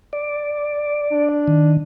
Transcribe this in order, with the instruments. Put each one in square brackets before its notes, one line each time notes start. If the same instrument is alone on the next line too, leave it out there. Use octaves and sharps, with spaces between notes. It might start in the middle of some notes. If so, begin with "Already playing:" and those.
[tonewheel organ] D5
[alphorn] D4
[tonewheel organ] D#3